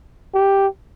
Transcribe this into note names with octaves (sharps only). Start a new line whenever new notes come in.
G4